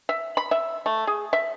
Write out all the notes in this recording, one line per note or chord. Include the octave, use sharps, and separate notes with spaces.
E5
B5
E5
A3
G#4
E5